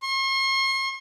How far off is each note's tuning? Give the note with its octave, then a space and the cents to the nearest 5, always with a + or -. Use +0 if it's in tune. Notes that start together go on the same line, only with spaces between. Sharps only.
C6 +45